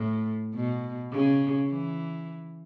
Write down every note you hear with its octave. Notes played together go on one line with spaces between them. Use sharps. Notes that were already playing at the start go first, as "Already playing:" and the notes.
Already playing: A2
B2
C#3
E3